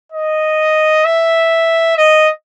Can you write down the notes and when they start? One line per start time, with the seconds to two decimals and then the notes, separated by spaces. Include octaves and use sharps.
0.12 D#5
1.05 E5
1.98 D#5